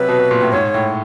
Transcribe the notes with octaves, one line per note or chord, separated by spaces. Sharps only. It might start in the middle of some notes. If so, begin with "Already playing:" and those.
Already playing: C3 F#3 B4
B2
B2
A#2
A2
G#2 C#5
A2